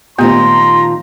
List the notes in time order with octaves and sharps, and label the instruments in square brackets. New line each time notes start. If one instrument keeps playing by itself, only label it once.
[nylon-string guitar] A#2 D#3 F3 [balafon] A3 B3 G4 [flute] A#5 [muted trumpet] C6